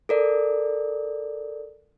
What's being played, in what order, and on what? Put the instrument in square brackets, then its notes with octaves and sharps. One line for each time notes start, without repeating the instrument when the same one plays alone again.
[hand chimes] A4 A#4 D5